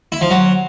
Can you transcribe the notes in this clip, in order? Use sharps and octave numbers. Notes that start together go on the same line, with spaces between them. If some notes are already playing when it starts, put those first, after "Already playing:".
E4
F3
F#3